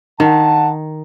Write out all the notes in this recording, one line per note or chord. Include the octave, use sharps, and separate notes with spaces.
D#3 F#5 A5